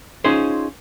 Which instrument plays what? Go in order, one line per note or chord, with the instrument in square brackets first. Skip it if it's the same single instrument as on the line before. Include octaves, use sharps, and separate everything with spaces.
[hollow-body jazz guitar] C#4 D#4 F4 G#4 C5